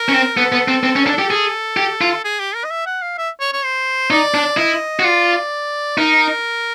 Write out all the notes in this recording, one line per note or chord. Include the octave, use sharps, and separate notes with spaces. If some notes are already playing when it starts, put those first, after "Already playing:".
Already playing: A#4
C#4
C4
B3 A4
B3
C4
C4
C#4
D4
G4
G#4
G4
F4
G#4
G4
A#4
D#5
E5
F#5
F5
E5
C#5
C#5
C5
D#4 D5
D4
E4 D#5
F#4
F4 D5
D#4 A#4